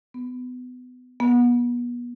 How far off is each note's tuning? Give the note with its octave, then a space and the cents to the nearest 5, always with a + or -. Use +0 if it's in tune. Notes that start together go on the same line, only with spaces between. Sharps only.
B3 +25
B3 -30